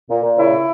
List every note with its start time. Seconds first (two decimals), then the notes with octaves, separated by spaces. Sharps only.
0.09 A#2
0.23 A#2
0.37 C#3 E4